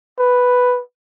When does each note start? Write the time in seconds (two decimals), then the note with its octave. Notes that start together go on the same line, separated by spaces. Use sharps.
0.19 B4